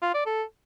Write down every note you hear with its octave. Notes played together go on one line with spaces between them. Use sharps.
F4
D5
A4